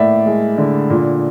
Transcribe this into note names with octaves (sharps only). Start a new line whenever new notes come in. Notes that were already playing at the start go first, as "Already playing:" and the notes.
Already playing: A2 A#3 D5 E5
G#3
D3
A#2